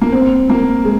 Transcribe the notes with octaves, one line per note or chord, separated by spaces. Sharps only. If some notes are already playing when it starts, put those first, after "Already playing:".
A#3
C4
A#3
G#3